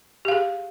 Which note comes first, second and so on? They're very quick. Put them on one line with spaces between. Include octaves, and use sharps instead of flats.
G4 F5 G#4